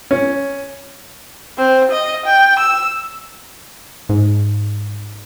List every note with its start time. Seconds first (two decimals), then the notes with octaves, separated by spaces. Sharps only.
0.11 C#4
1.58 C4
1.92 D#5
2.26 G5
2.59 E6
4.09 G#2